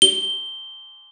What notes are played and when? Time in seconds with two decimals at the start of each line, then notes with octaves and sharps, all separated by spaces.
0.02 G7